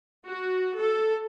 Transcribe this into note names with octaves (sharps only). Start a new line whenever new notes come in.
F#4
A4